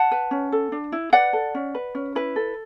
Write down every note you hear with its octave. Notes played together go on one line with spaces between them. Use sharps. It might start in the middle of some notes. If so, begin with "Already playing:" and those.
Already playing: F#5 A5
B4
C#4
A4
D4
E4
B4 D5 F#5
A4
C#4
B4
C#4
E4 B4
A4